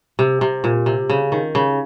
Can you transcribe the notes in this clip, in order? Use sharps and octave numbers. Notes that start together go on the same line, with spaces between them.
C3
C3
A#2
C3
C#3
D#3
C#3